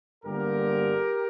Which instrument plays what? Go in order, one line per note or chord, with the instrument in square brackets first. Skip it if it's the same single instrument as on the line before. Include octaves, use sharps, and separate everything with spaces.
[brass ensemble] G1 G2 D3 G3 A#3 G4 A#4